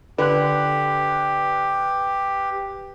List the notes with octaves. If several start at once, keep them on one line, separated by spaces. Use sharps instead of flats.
D3 G4 B4 F#6